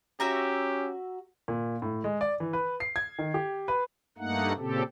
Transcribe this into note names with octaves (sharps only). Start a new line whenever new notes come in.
C#4 F#4 G4 E5 A#5
A#2
A2
G#3
D5
E3
B4
C7
G#6
D#3
G4
B4
G2 A3 A#3 D#4 F#5
A#2 C#3 C4 G4 A4